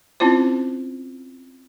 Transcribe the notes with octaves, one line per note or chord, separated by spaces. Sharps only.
C4 C#4 E4 F4 C5